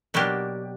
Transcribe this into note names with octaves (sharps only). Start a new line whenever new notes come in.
B2 F#3 A#3 D4 G4